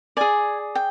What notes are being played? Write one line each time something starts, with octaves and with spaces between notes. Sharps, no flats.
G#4 D5 G#5
G5